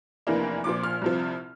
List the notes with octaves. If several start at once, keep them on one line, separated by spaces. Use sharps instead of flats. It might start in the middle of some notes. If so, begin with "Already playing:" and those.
F1 E2 E3 A#3 D4
A#1 A#2 F3 D6
F6
C2 C3 F3